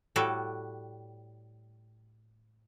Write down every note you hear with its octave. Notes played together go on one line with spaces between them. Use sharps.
A2 G3 F#4 A4